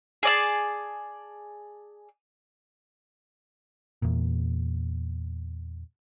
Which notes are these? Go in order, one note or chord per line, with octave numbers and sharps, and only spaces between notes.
G#4 D5 A5
E2 A#2